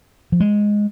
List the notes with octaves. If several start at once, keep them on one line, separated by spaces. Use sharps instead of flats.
F3
G#3